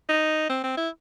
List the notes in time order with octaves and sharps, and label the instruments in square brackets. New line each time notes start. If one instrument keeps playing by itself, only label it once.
[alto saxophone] D#4
C4
C4
E4